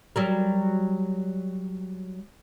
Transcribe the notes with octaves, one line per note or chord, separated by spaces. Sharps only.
F#3 G3 A#4